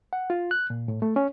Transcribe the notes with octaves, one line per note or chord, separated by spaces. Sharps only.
F#5
F4
F#6
A#2
A2
A3
C#4